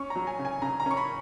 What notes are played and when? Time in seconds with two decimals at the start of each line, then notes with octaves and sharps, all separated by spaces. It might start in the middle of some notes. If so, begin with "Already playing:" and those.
Already playing: C#4 C#6
0.10 A#5
0.16 F#3
0.27 G#5
0.39 C#3
0.45 G#5
0.62 C#3 A#5
0.80 A#5
0.86 C#4 C#6
0.97 B5